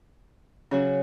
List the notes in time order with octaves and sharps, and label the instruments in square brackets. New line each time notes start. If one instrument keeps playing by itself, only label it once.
[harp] C#3 F#3 F#4 [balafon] C#4